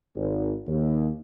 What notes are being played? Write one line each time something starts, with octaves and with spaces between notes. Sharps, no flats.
G#1
D#2